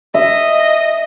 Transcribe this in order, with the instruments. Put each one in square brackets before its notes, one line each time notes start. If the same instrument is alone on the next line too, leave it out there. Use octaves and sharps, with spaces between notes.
[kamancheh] D#5 [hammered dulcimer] E5